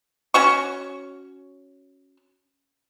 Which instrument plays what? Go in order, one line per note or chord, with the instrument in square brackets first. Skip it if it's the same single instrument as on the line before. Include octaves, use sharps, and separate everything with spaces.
[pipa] C#4 F#4 C#6